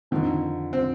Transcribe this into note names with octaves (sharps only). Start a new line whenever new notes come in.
F2 D3 D#3 F3
C4